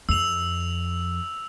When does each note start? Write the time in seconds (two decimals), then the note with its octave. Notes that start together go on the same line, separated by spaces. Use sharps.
0.09 F2 E6 F7